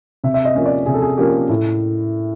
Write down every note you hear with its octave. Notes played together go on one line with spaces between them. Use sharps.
C3 E5
E5
D#5
F3 A#3 C#4
D5
C3 G#4
A4
G#4
F3 A#3 C#4 G4
A2